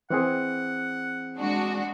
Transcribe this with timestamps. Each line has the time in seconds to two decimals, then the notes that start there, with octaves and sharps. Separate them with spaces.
0.10 E3 C4 G#4 F#5
1.36 G#3 D4 F#4